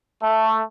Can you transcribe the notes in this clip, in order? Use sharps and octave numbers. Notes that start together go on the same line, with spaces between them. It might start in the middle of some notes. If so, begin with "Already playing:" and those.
A3